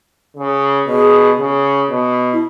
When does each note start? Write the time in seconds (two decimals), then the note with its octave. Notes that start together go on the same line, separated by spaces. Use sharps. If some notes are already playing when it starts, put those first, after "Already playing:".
0.36 C#3
0.87 B2 G#4
1.39 C#3
1.90 B2
2.33 E4